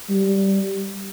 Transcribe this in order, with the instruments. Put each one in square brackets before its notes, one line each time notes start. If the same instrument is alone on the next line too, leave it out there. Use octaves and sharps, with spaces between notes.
[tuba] G3